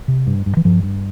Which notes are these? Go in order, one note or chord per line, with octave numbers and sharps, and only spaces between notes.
C3
G2
G2
E3
G2 F3
G2